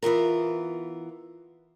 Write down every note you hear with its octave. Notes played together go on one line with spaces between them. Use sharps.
E3 B3 F4 A#4